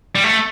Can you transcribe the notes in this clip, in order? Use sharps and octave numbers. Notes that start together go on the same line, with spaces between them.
G3
A3